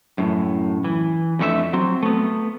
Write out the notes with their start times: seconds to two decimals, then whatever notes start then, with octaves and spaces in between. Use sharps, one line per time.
0.18 F#2 A2
0.84 E3
1.39 F2 D3 A3 A4 E5
1.73 F#3 C4
2.03 A3 B3